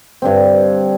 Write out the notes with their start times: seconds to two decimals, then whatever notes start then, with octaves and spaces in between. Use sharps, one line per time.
0.22 G2 D3 C4